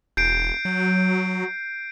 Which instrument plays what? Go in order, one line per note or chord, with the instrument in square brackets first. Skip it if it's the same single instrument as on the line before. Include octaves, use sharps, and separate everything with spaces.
[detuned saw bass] E1 [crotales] G6 C7 D7
[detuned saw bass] F#3